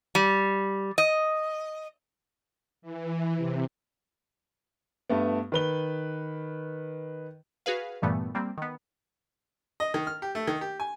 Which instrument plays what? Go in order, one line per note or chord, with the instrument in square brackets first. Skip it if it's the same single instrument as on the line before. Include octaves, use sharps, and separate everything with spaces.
[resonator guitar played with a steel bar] G3
D#5
[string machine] E3
C3
[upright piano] G2 A3 B3
D#3 B4 G7
[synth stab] F#4 G#4 B4 F5
G2 A#2 E3 G3 A3 B3
G3 A#3 C4
D#3 B3
[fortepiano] D#5
D#3
F6
G4
A3
D#3
G4
G#5